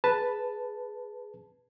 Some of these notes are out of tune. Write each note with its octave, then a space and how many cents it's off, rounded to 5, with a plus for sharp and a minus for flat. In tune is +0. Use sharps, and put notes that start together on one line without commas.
G#4 +10 B4 +0 A5 +0